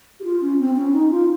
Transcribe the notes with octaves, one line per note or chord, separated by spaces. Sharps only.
G4
F4
C#4
C4
C#4
D#4
F4